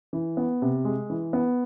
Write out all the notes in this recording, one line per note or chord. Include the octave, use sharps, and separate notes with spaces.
E3
B3
C3
G#3
E3
B3